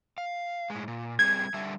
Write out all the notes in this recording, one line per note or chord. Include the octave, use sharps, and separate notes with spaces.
F5
A2 G#3
A#2
G3 C4 G#4 G#6
D3 G3 E5